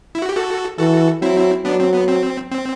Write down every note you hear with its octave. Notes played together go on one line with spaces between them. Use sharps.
E4
F#4
G4
F#4 A4
E3 F#4 A4
F#3 C4 E4
F#3 B3 D4
C4
B3
C4
C4